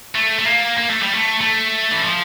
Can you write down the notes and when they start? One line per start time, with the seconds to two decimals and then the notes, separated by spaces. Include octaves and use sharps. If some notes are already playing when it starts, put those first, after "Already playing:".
0.15 A3
0.39 A3
0.46 A#3
0.78 A#3
0.90 A3
1.02 G3
1.14 A3
1.41 A3
1.92 E3
2.04 F3